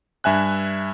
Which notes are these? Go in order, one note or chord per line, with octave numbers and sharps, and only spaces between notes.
G2 E5 G#5 F#6